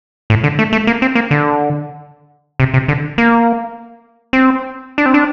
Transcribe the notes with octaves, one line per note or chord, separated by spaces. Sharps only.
A2
D3
A3
A3
A#3
C4
A#3
D3
C3
C3
D3
A#3
C4
D4
C4
D4